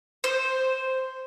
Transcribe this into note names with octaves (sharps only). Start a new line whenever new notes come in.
C5